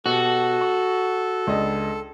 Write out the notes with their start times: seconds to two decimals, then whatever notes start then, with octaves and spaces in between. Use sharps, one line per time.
0.06 B2 F#4 G4 A4
0.61 C#6
1.47 C#2 D4 D#5